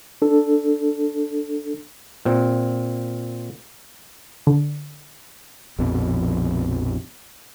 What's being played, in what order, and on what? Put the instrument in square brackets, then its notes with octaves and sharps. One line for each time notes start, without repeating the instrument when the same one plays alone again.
[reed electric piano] D4 A4
[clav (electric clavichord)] A#2 C4
[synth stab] D3
[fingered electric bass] A#1 F2 B2